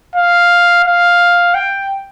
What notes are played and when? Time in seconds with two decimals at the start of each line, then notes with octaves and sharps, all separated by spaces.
0.16 F5
0.85 F5
1.54 G5